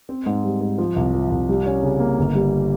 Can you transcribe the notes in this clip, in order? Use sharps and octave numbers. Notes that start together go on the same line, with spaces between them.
C4
G#2
G3
G#2
F3
C2
F3
C2
G3
C#4
C#3
A#3
G1
G3